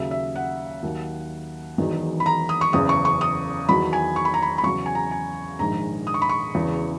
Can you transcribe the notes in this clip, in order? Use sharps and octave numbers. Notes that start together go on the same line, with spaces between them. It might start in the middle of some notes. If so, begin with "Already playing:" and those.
Already playing: D#2 C#3 F#3 E5
E5
F#5
D#2 D#3 F#3
E1 E2 D#3 F#3
B5
A#5
D#6
C#6
F#1 E2 C#3 D#6
C#6
C#6
D#6
E2 D#3 F#3 B5
G#5
C#6
B5
A#5
B5
B5
E2 C#3 F#3 C#6
G#5
A#5
G#5
A#1 G#2 D#3 A#5
D#6
C#6
B5
C#6
E1 E2 C#3 E3